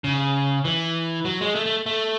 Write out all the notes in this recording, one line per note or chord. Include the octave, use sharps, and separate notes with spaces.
C#3
E3
F#3
G#3
A3
A3
A3